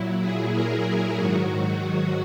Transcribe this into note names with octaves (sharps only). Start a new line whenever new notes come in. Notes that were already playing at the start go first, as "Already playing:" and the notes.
Already playing: A#2 F#3 E4
G#4
A#4
G#4
G#2 D#3 F#3 F#4